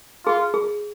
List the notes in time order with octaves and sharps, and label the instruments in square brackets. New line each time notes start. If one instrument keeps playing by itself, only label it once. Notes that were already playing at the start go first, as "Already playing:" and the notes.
[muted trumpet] F4 [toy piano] G#4
[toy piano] G#4